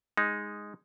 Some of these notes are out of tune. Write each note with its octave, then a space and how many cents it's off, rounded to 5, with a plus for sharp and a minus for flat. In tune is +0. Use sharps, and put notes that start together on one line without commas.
G#3 -5 D#4 +0